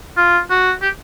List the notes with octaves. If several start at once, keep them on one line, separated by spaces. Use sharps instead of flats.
F4
F#4
G4